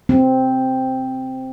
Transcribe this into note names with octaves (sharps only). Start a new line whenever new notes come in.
C4